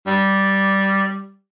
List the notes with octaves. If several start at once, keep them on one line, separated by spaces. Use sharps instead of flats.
G3 D5